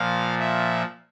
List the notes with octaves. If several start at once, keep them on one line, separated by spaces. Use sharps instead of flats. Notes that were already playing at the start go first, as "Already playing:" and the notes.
Already playing: A#2 F3 F5
E5